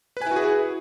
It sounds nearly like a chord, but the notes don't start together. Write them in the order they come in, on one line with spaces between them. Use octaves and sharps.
B4 G#5 E4 F#4 G#4